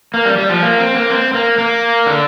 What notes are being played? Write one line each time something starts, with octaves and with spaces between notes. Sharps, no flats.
A#3
G3
G3
F3
A#3
C4
A#3
C4
A#3
A#3
D3